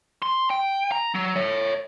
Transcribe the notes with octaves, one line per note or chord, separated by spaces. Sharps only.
C6
G5
A#5
F#3
C#5 E5